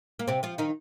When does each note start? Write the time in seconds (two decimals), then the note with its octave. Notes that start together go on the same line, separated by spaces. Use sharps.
0.19 A#3
0.28 C3 C4
0.43 F3 F4
0.58 D#3 D#4